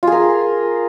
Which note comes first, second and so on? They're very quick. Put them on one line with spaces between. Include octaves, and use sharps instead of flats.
F4 G#4 A#4